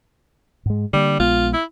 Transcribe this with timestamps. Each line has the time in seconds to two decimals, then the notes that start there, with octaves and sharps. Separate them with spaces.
0.66 G#2 G#3
0.93 D3 G3 A#3
1.20 A#1 G#3 B3 F4
1.54 E4